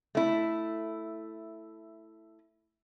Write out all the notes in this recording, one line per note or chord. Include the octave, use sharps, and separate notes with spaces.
A3 E4